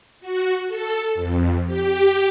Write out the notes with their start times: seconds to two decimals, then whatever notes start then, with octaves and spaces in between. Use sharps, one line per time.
0.20 F#4
0.67 A4
1.15 F2
1.66 G4